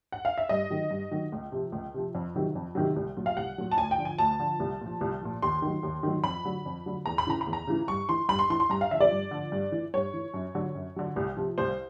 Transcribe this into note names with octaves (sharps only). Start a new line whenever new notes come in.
F#5
F5
E5
G2 D#5
D#3 F#3
G2
D#3 F#3
C#2
C3 F3
C#2
C3 F3
F2
C3 D#3 F#3
F2
C3 D#3 F#3
C2
A#2 F#3
F5
C2 F#5
A#2 F#3
A5
D2 G#5
G5
D3 F3
G#5
D2 A5
D3 F3
C2
A#2 F3
C2
A#2 F3
D#2 C6
D#3
F#3
D#2
D#3 F#3
F2 B5
D3 F#3
F2
D3 F#3
E2 A#5
B5
C#3 E3 A#5
B5
E2
A#5
C#3 E3
G2 C#6
E3 C6
G2 B5
C6
E3 C6
C6
G2 A#5
F5
D3 F3 E5
D5
G2
D3 F3
G2
E3
G2 C#5
E3
F#2
D3 F#3
F#2
D3 F#3
C2
C3 F3
C2 C5